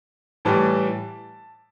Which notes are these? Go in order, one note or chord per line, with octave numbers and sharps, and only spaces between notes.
A2 E3 G3 A5